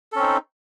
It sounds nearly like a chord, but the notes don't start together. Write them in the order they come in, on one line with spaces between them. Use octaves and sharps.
A4 C#4 C4 D#4